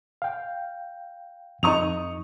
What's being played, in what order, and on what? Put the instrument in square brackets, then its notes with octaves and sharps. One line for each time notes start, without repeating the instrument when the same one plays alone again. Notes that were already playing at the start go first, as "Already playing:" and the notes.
[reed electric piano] F5 G5
[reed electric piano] F2 D#4 [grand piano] C#6 D#6 F7